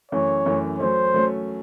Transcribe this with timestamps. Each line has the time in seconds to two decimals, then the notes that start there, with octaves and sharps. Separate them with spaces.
0.11 F#2 E3 A3 C#5
0.46 F#2 E3 A3
0.79 F#3 A3 C#4 C5
1.14 F#3 A3 C#4